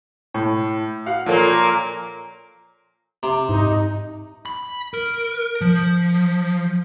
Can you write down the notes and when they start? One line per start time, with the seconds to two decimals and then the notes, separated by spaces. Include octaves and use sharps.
0.34 A2
1.06 F#4 F5 F#5
1.26 A#2 F3 A#3 A4 C#5
3.23 C3
3.49 G#2 D#4
4.46 B5
4.94 A#4
5.61 F3